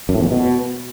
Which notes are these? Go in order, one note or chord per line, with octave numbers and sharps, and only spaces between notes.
F#2
A2
E2
A#2
B2